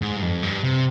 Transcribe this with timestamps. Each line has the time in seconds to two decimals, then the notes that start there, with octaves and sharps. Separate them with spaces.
0.02 G#2
0.16 G2
0.22 F2
0.43 G2
0.64 C3